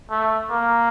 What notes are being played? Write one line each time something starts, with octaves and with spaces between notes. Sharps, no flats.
A3
A#3